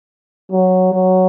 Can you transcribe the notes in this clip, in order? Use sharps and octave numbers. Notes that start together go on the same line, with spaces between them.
F#3
F#3